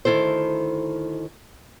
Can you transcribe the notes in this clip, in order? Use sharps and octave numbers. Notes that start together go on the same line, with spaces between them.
D2 D#3 E4 A4 C5